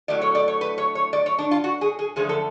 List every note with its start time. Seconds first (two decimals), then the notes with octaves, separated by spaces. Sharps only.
0.08 A2 F#3 A3 D5
0.22 C#5
0.35 D5
0.48 C#5
0.61 B4
0.78 C#5
0.95 C#5
1.13 D5
1.26 C#5
1.39 D4
1.51 F4
1.64 F#4
1.81 G#4
1.99 G#4
2.16 F#2 D3 F3 A3 G#4
2.29 A4